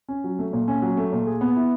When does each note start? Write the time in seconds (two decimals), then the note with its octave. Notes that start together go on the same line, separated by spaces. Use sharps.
0.08 C#4
0.24 F#3
0.39 A3
0.53 A#2
0.68 C#4
0.82 F#3
0.97 A3
1.12 A#2
1.27 G#4
1.41 B3
1.56 E4